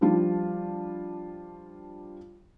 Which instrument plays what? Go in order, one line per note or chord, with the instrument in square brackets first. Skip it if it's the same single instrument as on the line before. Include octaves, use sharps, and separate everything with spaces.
[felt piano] F3 G3 D4 F4